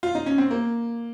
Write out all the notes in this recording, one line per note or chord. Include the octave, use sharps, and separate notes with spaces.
F4
D#4
C#4
C4
A#3